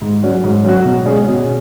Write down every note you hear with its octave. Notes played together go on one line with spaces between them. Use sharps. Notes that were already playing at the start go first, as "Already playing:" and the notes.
G#2
F#3 C#4 F#4
G#2
F#3 C#4 F#4
B2
G#3 C#4 G#4
B2